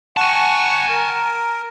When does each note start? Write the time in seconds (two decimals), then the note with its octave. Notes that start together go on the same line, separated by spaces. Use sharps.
0.17 F#5 G#5 A5 C#6
0.89 A#4